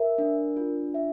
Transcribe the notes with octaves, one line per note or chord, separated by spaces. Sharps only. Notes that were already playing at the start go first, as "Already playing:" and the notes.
Already playing: A#4 E5
D4
F4
E5